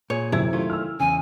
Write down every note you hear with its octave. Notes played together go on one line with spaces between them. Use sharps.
A#2 G#4 C#5
F#2 C3 E4 G#6
D#3 A3 F4
E6 F6
E2 C#3 G#5